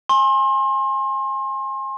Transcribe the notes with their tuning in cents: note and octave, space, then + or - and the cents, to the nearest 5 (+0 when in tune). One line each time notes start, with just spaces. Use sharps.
G#5 +0 C6 +35